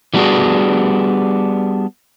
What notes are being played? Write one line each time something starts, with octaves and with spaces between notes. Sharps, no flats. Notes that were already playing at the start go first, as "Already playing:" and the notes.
E3 G3 B3 D4 F#4 G#4